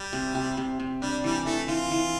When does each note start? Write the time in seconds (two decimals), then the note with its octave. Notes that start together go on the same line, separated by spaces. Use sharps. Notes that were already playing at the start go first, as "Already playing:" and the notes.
Already playing: G3
0.13 C3
0.35 C3
0.57 C3
0.80 C3
1.02 G3 D4
1.24 E3 G3
1.46 E3 A3
1.68 E3 F4
1.91 E3